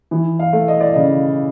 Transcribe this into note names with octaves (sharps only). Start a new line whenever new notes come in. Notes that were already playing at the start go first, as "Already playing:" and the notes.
E3
F5
A3
D#5
D5
C#3 D#5